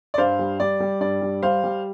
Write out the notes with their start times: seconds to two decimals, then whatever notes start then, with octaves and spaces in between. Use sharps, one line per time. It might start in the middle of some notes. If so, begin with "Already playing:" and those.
0.14 D5
0.18 G2 C5 F5
0.39 G3
0.60 G3 D5
0.80 G3
1.01 G2 D5
1.22 G3
1.42 G3 C5 F5
1.64 G3